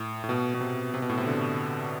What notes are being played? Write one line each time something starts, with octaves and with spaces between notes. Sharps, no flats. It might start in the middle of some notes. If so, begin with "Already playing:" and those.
Already playing: A2
A2
B2
B2
C3
C3
B2
A2
C3
D3